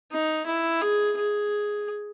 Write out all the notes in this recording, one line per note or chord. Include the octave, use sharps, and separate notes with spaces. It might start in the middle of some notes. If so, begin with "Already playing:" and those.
D#4
E4
G#4
G#4